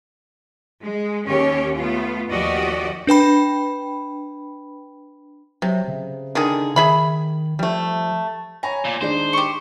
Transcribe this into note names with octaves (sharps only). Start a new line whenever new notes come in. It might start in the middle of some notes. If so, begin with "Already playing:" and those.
G#3
D#2 C#4 G4 C#5
A3 B3 F4
D#2 F3 F#4 G4 D5 D#5
D4 B4 G5 B5
C3 F#3
C#3
D3 D#3 G#4
D#3 G#4 E5 B5
F3 G3 A3
C#5 G#5 A#5 B5
A#2
D#3 G#3 D4 C5
G4 C#6